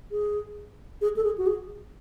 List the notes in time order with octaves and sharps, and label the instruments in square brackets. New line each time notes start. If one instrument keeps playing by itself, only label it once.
[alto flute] G#4
G#4
A4
G#4
F#4
G#4